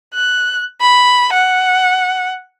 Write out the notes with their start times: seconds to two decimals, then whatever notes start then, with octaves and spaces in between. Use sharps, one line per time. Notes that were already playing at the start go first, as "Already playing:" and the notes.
0.14 F#6
0.81 B5
1.33 F#5